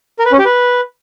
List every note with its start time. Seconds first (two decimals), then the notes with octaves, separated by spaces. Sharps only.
0.19 A#4
0.26 B4
0.32 C#4
0.39 G4
0.45 B4